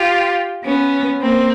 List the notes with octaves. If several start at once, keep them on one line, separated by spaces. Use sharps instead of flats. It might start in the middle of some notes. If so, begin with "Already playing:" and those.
Already playing: F4 G4
B3 C#4
A#3 C4